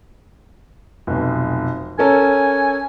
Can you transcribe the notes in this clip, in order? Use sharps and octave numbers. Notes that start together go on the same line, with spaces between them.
F1 B1
C#4 A4 A#4 G#5